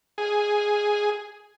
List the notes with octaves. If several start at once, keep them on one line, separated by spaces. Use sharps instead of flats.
G#4